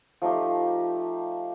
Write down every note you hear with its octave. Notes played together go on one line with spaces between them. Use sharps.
F3 A3 D#4 G4